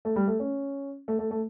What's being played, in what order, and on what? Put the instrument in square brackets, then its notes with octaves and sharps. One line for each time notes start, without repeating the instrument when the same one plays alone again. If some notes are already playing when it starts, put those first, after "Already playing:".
[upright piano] A3
G3
A3
C#4
A3
A3
A3